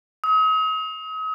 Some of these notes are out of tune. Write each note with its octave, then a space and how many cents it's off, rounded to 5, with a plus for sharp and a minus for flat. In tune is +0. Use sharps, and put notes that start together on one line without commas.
D#6 +40